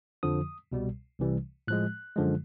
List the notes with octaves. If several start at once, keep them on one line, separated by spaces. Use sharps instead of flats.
F2 D3 F3 D#6
C2 B2 G3
C2 C3 E3 G3
A2 F3 G#3 F#6
F#2 D3 F3 G#3